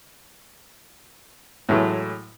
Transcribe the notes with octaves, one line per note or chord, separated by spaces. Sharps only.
A2 E3 F#3 G#3 A3